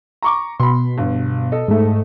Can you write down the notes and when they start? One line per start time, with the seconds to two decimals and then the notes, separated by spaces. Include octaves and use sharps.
0.22 A#5 C#6 D6
0.60 B2 B5 C6
0.98 G1
1.52 A4 D#5
1.68 G#2 A3